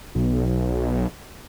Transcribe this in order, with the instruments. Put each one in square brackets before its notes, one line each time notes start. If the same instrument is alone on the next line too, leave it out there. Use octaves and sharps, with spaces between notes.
[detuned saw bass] B1